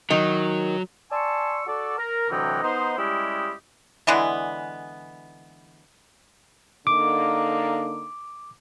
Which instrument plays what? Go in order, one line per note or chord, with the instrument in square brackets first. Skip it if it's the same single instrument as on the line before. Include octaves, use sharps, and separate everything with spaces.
[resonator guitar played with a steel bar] D#3 [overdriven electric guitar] F#3
[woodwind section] D5 G#5 A5 C6 C#6 E6
F#4 A4 D5
A#4
D2 C3 E3 F#3 D#5 G5
B3 D#4 C5
G3 G#3 C#4 E4 G4 D#5
[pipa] D3 E3 G#3 B3
[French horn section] D3 A#3 D#4 [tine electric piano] D6